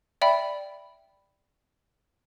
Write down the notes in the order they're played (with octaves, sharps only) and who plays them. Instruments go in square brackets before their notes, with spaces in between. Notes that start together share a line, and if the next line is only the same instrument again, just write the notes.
[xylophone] D5 E5 G5 B5